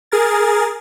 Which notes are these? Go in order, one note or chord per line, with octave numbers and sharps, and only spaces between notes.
G#4 A#4 A6